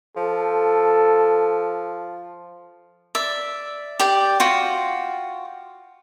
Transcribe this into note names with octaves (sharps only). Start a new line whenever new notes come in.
F3 A4
D5 E5
G4 D5 G5
F4 F#4 G5